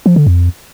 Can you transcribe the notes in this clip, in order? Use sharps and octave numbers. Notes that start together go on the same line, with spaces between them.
F3
D3
F2